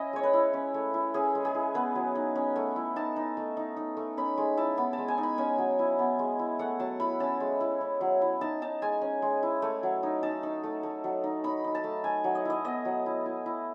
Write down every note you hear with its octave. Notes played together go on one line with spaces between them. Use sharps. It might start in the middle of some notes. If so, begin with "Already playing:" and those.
Already playing: C#4 E4 D#5
G#3 C#5
B4
E4
C#4
A3
E4
C#4 G#4
G#3
G#4
E4
B3 B4
F#3
D#4
C#4
A3
E4
D#4 A5
D#4
A3
D#4
D#4
A3
C#4 B5
G#3
E4 A5
B3 B5
A5
G#3
G#5
D#4
B5
C#4 G#5
F#3
E4
B3
G#3
E4
A3 F#5
F#3 A5
E4 B5
C#4 A5
G#3
E4
C#4
F#3
E4
D#4 A5
D#4 A5
G#3 G#5
C#4
G#3
E4
A3
F#3
D#4
D#4 A5
D#4
A3
A3
F#3
D#4
D#4 B5
D#4
A5
A3
A3 G#5
F#3
D#5
E4 D#5
B3 D#5
F#3
E4
E4
E4